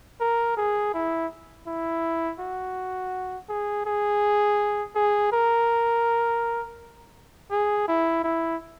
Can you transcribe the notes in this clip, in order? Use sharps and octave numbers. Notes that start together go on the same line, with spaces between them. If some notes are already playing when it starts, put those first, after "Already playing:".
A#4
G#4
E4
E4
F#4
G#4
G#4
G#4
A#4
G#4
E4
E4